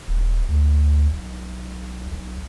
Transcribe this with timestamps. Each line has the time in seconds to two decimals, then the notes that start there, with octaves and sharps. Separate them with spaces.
0.08 D#1
0.48 D2
1.13 B1
2.13 B1